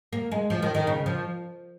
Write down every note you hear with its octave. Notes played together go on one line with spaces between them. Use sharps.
A#3
G#3
F3
D#3
D#3
C#3
F3